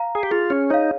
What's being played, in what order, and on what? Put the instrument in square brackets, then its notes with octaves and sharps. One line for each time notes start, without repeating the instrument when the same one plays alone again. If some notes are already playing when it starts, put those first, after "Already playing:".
Already playing: [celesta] F5 A#5
[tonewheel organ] G#4
G4
[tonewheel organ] F4 [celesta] G#4
[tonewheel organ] C#4
[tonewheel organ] D#4 [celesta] C#5 F5